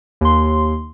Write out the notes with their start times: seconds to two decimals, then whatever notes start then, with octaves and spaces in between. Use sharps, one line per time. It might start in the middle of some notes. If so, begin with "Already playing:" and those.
0.21 D#2 C6